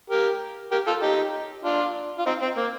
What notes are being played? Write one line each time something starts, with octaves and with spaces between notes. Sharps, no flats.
G4 A#4
G4 A#4
F4 A4
D#4 G4
D4 F4
F4
C4 D#4
C4
A#3